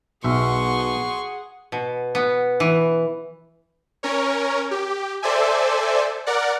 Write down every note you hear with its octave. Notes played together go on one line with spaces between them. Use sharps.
B1 B2 G#4 E5 F#5 C6 C#6
B2
B3
E3
C#4 A#4 C#5
G4
A4 C5 D5 E5 G#5
A#4 D5 F#5